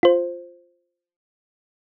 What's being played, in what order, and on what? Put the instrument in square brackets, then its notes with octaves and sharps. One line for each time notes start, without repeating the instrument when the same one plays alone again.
[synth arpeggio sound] F4 C5